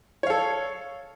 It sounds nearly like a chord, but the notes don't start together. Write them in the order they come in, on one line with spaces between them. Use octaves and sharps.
C#5 F5 A4